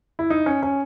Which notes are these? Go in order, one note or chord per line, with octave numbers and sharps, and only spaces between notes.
E4
D#4
C#4
C#4